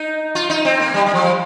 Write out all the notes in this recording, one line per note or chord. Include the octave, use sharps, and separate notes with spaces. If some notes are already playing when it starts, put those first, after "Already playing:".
Already playing: D#4
F4
D#4
C4
A#3
G3
G3
F3